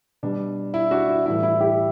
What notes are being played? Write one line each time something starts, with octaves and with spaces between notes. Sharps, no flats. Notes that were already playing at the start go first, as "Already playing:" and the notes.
B2 G3 D4
E4
D4 F#4
E4
A2 E3 G3 E4
E4
E4 G4